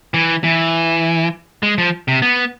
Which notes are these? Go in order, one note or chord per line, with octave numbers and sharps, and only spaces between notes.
E3
E3
G#3
F3
C3
B3